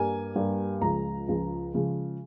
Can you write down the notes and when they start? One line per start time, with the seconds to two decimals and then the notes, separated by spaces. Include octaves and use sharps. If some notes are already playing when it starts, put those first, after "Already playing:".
Already playing: G2 G3 A#3 G#5
0.35 G2 G3 A#3
0.81 C#2 C#3 F3 G#3 A#5
1.28 C#2 C#3 F3 G#3
1.74 C#3 F3 G#3